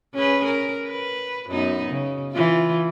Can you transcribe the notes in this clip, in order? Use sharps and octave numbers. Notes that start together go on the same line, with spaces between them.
C#4 G#4 B4
A#4
B4
F#2 B3 D#4
C#3
E3 F4